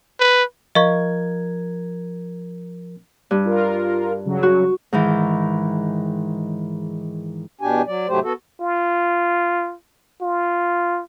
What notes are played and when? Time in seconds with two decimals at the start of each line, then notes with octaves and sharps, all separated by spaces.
0.20 B4
0.75 F3 A#4 D#5 F5 C#6 G#6
3.31 G2
3.46 F4 A#4
4.26 C#3 F#3
4.43 F#4
4.93 G#2 D#3 E3
7.61 E2 B2 D4 G4 G#5
7.87 F#3 D5
8.08 G#2 C3 F#3 A3 G4 C5
8.23 B3 F#4 A4
8.61 F4
10.22 F4